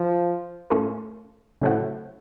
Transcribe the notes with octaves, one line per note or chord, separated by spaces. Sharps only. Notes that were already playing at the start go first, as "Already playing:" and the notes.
Already playing: F3
A2 A3 C#4 F4 A#4
A2 C#3 F#3 A3 C4 F#4